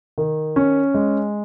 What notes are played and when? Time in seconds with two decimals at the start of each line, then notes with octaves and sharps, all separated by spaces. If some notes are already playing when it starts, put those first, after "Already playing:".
0.18 D#3
0.56 C#4
0.94 G#3